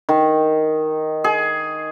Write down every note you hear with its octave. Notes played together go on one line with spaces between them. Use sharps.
D#3
G#4